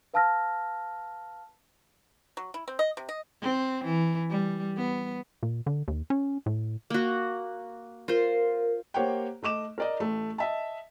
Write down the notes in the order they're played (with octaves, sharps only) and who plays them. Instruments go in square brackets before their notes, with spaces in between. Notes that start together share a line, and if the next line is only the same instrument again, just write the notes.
[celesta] B4 F5 A5 E6 F6 A#6
[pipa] F#3
E4
C4
D#5
C3
D#5
[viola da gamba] C4
E3
G3
B3
[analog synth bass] A#2
D3
D#2
C#4
A2
[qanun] A#3 F#4
[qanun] F4 C5 [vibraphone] A#4
[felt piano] A#3 G4 C5 C#5 F#5 G5
A3 D#5 D6 E7
A#4 D5 D#5
A1 A3
D#5 E5 A5